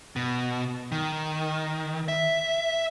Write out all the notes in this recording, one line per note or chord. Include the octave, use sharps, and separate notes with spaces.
B2
D#3
E5